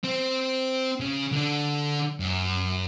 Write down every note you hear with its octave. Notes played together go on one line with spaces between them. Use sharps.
C4 C5
C#3
D3 D4
F#2